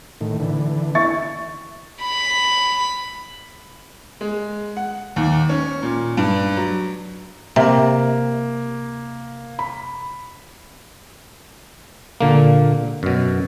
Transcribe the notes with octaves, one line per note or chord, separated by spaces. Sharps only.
A2 D#3
D3 E3
E4 C#6 A6
B5
G#3
F#5
D#2
C#4
A#2
G2
F#3
C3 A#3
B5
A#2 D3 A#3
F#2 B2